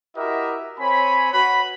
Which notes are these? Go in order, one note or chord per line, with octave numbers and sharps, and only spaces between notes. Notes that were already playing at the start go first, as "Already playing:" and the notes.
E4 F#4 G4 A#4 D#5 E5
C4 C#5 G#5 B5
F#4 B4 B5